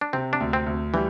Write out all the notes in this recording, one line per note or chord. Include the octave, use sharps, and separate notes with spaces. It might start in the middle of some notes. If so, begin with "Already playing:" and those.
D4
C3 C4
D4
D2
C4
D2
E3 G3